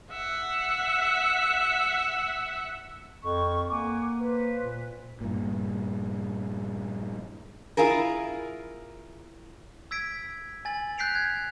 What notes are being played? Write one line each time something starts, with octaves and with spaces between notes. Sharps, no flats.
E5 F#5
F2 C#6
A#3 F#5 G#5 D6
B4 C5
A#2
G2 A#2
E4 F4 G#4 A#4
E6 G#6 B6 D7
G#5 A6 F#7
F#6 G6 B6 C7 D7 F7
G#6